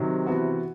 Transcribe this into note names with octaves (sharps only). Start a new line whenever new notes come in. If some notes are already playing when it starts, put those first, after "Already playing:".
Already playing: C3 D#3 F#3
E3 B3 F#4